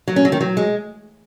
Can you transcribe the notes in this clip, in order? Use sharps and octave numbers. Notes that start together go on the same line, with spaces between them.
F#3
C#4
F#3
D#3
F#3
G#3